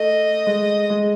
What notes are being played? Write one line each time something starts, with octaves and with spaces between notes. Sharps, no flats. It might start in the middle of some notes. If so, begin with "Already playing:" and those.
Already playing: A3 D#5
G#3
G#3